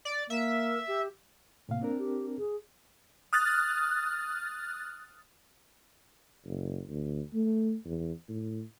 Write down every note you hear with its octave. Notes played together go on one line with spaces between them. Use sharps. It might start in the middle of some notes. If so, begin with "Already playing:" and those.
D5
A#3 A#4 E5
G4
A2 C3 A#3 F5
C4 D4 A#4
G4
G#4
D#6 F6 F#6 A6
F#1
D2
A3
E2
A2